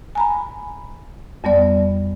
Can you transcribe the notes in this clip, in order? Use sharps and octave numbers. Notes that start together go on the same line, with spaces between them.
G#5 A#5 B5
F2 G3 B3 D5